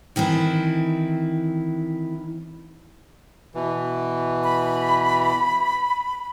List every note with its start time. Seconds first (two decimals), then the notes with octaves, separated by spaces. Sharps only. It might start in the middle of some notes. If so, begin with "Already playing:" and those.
0.16 D#3 E3 C4 E4
3.55 B2 E3
4.44 B5